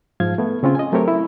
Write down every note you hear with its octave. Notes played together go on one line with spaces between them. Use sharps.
G#2 F3 F5 G#6
A3 B3
C#3 C4 C#4 F4
D#5 G#5
F#3 A3 C4 G4 A#4 C#5
E4